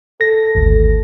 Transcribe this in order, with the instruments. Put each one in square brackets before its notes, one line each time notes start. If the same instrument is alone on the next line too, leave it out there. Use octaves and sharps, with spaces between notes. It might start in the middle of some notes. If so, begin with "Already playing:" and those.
[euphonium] A4 [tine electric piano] A#6
[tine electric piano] G#1 D2